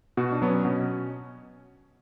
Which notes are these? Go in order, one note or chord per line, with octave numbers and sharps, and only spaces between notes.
B2 F#4
D4
F#3 B3
C#4
B2